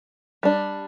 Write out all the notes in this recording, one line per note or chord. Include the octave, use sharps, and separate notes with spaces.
G3 D4